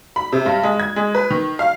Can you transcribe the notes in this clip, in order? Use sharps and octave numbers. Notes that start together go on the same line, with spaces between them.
B5
C3
G2
G#3
G#6
G#3
B4
D#3
F5